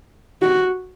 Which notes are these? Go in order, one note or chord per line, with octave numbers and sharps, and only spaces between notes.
F#4